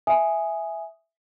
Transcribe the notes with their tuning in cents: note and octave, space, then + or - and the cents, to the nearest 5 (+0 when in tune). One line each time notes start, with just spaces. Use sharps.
E5 +0 G#5 +0 D#6 +0